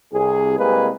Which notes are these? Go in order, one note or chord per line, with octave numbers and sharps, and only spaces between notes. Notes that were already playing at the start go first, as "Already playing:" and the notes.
C2 G#4
C2 C3 G#3 A#3 G#4 B4